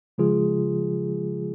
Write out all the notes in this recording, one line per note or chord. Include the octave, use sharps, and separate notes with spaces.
C#3 F3 G#3 F4 G#4